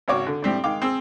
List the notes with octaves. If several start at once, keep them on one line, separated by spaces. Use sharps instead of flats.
G#1 C#3 F#4 C#5 D6
D3
A2 G3 C4 D4
D#3 G#3 F5 G5 D6
C4 G#4 E6